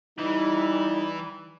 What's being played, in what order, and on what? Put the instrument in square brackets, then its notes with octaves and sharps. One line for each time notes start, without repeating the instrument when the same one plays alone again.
[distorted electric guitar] E3 [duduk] G3 [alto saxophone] D#4 [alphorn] E4